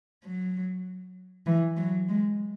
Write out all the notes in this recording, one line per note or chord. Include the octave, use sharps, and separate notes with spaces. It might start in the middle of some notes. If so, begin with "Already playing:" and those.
F#3
E3
F#3
G#3